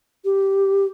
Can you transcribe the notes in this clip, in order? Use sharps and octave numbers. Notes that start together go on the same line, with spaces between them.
G4